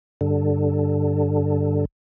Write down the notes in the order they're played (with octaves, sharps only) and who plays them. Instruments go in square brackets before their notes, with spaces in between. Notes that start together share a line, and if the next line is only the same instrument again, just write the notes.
[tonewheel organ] G2 D3